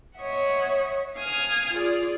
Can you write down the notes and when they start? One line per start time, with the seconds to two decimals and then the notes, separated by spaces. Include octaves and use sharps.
0.17 C#5 D#5 E5 F#5
1.16 F5 G#5 D#6 F6
1.73 F4 G#4 D5